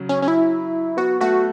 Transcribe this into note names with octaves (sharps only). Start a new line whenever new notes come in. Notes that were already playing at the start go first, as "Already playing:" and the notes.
Already playing: C#3 F#3
C#4
C#4
E4
B3 F#4
A3 F#4